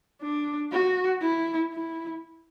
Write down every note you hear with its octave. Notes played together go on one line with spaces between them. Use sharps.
D4
F#4
E4
E4